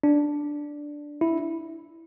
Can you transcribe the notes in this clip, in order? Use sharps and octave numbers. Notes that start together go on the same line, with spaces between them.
D4
E4